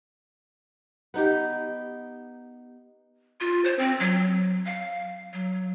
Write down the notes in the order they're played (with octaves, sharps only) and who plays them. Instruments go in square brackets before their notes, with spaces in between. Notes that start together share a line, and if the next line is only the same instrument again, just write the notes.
[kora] B3 D#4 G4
[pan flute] F4
C5
C4
F#3
F5
F#3